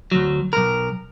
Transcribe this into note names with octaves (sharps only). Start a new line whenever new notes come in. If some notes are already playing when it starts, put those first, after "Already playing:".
D2 F#3
B1 A#4